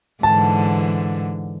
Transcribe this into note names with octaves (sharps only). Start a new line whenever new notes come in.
G#2 D3 E3 A5